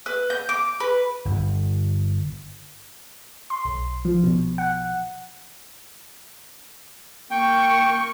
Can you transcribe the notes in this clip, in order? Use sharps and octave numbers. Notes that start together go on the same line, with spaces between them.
B4
G6
D6
B4
G1
C6
B1
F3
B2
F#5
A#3 G5 C#6